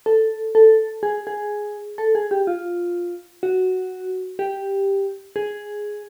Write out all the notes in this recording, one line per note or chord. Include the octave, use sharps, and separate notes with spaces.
A4
A4
G#4
G#4
A4
G#4
G4
F4
F#4
G4
G#4